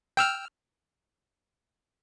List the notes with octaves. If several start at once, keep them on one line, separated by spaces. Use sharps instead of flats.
G5 E6 F6